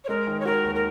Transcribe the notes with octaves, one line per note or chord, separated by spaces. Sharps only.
C#5
G#3 A#4
D#3
C#5
F#4 A#4
D#2
A#4